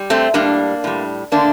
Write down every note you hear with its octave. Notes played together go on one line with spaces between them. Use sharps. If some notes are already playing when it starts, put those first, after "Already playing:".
Already playing: G3
A3 C4
A2 G3 A#3 D4
A2 G3
D3 A3 A#3 D4